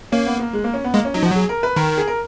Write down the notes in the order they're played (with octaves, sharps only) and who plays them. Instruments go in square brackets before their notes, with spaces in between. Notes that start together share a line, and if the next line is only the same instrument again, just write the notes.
[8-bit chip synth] A#3 [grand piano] C#4
[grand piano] B3
A#3
G#3
A#3
C#4
B3
[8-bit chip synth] G#3 [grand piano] A#3
[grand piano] C#4
[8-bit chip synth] F#3 [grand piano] D#4
[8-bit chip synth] F3 [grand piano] F#4
[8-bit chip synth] F#3 [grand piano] G#4
[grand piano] A#4
B4
[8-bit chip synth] D#3 [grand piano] A#4
[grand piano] G#4
A#4